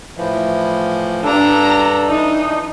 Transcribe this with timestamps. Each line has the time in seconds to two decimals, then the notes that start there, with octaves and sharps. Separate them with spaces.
0.18 A2 E3 F3
1.24 G2 D4 A4 A#5
2.09 E3 D4 D#4